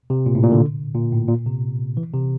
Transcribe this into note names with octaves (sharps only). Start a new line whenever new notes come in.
C3
A#2
A2
A#2
D3
A#2
A2
A#2
C3
E3
C3